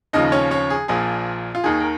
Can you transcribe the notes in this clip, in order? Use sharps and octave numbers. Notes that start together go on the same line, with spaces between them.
D#2 C#3 F3 D#4 D#5
C#4 C#5
C#4 C#5
G#4
A#1 A#2 F3 G#4
F4
D#2 D#3 G#4
A#4